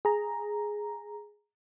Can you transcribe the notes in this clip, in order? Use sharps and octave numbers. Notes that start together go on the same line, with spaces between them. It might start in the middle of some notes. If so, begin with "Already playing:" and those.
G#4 A#5